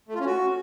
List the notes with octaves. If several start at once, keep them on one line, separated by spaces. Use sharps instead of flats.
A3
F4
C#4
F#4